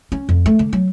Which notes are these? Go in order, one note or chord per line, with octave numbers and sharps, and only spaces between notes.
C#4
F2
A3
D3
F#3